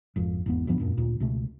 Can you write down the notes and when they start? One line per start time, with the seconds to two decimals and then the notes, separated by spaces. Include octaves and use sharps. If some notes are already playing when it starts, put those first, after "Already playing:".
0.16 G#1 F2
0.46 G#1 E2 B3
0.67 D2 G2 F3 B3
0.80 E1 F#2 A#2
0.97 D2 A#2
1.20 C#2 B2 A3